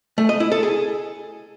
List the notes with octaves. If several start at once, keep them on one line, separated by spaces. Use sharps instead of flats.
A3
D#5
E4
A4
G#4